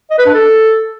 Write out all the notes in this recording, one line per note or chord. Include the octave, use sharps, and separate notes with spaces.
D#5
B4
D4
A4